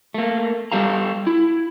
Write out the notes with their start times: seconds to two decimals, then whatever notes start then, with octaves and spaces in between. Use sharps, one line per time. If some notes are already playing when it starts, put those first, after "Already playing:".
0.14 A3 A#3
0.72 G3 G4 A4 F5 A#5
1.27 E4